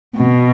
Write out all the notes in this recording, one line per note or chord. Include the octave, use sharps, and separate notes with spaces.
B2